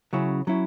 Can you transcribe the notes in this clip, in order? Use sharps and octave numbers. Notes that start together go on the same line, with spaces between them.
C#3 F#3 C#4 E4
F#3 C#4 E4